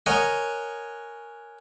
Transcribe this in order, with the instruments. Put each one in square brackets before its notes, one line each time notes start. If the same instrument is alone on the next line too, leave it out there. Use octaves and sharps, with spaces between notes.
[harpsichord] A#4 C#5 D#5 F#5 G#5